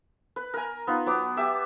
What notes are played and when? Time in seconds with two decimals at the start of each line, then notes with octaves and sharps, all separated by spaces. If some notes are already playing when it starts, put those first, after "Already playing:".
0.36 B4
0.54 A#4 G#5
0.87 B3 D#4 F4
1.06 F#3 B3 D6
1.37 G4 E5 A5